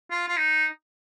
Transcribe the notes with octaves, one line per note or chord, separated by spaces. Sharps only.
F4
F4
D#4